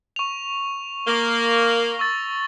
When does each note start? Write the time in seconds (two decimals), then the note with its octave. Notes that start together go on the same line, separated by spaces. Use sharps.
0.16 C#6 F7
1.07 A#3 A#6 F7 G7
1.99 C#6 E6 A6